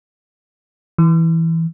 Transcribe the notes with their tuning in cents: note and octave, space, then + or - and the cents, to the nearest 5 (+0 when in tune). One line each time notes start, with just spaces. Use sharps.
E3 -10